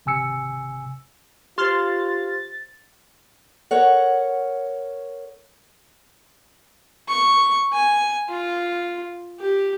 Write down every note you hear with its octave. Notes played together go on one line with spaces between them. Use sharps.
G#1 C3 G#5 E6 C#7
F4 G4 C5 C6 F6 A6
A#4 C#5 F#5
C#6
G#5
F4
G4